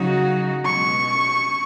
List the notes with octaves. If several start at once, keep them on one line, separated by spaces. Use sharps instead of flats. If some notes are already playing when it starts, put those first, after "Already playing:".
Already playing: C#3 F#3 D#4 F#4
B2 G#3 C#4 C#6